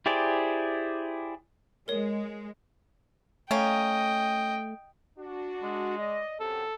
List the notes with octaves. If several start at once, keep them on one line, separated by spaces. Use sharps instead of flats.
E4 G4 G#4 C5 D5
G#3 A#4 C#5
A3 A#3 C#4 D#5 G5
D4 F#4
G#3
D5 D#5
F#2 C3 A4